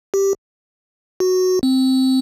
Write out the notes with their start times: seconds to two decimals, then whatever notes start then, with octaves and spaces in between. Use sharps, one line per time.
0.14 G4
1.20 F#4
1.63 C4